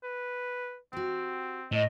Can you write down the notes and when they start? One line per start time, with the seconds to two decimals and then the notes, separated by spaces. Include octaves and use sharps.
0.04 B4
0.93 C4 F#4 G4
1.72 A2 D#5